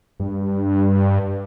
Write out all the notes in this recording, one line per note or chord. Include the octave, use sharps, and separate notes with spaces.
G2